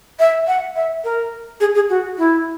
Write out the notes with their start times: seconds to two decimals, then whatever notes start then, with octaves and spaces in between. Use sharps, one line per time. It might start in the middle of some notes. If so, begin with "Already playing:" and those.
0.20 E5
0.47 F#5
0.76 E5
1.04 A#4
1.60 G#4
1.75 G#4
1.90 F#4
2.18 E4